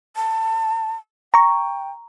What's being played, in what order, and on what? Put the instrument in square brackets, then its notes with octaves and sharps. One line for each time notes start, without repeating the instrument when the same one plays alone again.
[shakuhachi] A5
[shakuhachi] G5 [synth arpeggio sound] A#5 C#6